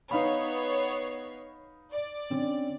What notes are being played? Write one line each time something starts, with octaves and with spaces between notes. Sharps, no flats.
B3 D#4 C#5 F5 B5 C7
D5
D3 C4 C#4